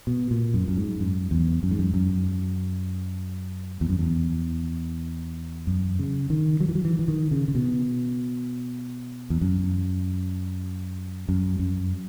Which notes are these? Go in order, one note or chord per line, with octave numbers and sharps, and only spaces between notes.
B2
A#2
F#2
F#2
G#2
F#2
E2
F#2
G#2
F#2
F#2
E2
F#2
E2
F#2
C#3
D#3
F#3
E3
F#3
E3
E3
D#3
C#3
C#3
B2
E2
F#2
F#2
F#2